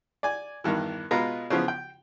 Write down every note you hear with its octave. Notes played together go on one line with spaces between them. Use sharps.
D5 G#5
E2 G2 D#3 E3
B2 G#3 F4 B4 A#5
C#3 E3 F3 B3
G5